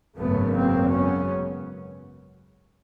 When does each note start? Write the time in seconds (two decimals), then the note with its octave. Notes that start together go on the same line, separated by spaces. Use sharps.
0.17 G#1 F#2 C#3 A3 B3
0.54 A#3 C4
0.91 B3 C#4